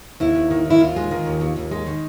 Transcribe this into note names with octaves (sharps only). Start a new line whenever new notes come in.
D#2 E4
D#2
D#3
D#2
E4
D#2 F4
G#3
D#3
D#2
D#2
D#2
G#3
D#3